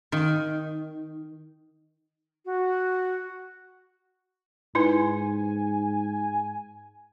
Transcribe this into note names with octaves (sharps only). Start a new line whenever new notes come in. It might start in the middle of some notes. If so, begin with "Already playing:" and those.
D#3
F#4
G#2 D#4 E4 B4 G#5